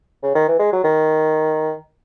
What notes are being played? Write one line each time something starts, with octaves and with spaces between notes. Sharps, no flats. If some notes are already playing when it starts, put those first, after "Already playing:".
C#3
D#3
E3
G#3
F#3
D#3